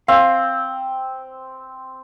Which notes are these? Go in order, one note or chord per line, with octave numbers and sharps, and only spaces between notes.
C4 F5